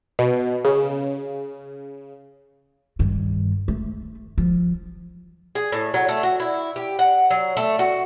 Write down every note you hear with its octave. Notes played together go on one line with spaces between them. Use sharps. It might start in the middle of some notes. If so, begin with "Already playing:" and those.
B2
C#3
G2 D#3
A3
F3
G#4
A2
F#3
A3
F#4
E4
G4
F#5
F#3
A3
F#4